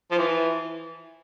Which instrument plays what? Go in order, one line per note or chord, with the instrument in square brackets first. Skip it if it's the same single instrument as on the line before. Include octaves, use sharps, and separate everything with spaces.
[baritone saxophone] F3
E3